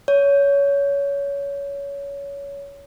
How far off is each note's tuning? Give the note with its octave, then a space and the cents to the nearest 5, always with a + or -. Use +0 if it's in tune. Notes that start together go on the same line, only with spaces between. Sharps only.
C#5 +20